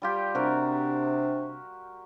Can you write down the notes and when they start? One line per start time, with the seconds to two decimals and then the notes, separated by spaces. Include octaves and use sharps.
0.02 G3 F4 G4
0.35 C3 D4 F#4 A#4